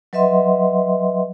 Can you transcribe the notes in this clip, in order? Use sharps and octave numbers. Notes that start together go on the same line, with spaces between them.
F#3 B4 D#5 E5 F#5 C6